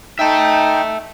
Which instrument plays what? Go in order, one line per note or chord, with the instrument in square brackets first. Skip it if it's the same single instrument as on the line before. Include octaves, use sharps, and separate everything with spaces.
[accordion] D#4 G5 [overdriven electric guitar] E5 A5